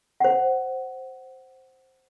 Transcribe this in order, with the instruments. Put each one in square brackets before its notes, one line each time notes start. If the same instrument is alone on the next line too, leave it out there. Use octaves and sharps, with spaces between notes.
[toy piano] C5 F#5